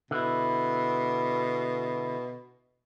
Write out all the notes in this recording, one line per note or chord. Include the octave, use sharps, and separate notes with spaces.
B2 D3 E4